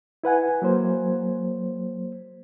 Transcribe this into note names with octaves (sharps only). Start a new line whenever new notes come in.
E4 B4 F#5 G#5
F#3 A#3 C5